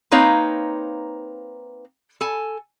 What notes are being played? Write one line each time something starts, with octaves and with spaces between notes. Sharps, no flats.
A#3 C4 D#4 B4 C#5 F5
A4 G#5